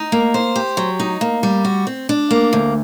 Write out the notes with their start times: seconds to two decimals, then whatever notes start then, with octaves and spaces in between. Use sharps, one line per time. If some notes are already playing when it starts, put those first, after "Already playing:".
Already playing: D#4
0.12 A#3
0.34 C5
0.56 G4
0.77 F#3
1.00 D#4
1.21 A#3
1.43 G3
1.65 F#4
1.87 C4
2.09 D4
2.31 A#3
2.53 D2